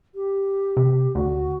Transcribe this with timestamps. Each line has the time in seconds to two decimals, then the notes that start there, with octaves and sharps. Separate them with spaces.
0.15 G4
0.77 C3
1.15 D2 F#4